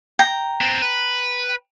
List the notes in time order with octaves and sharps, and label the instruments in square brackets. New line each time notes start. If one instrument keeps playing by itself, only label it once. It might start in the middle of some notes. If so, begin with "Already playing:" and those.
[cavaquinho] G5 A#5
[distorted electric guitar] B3 C4
B4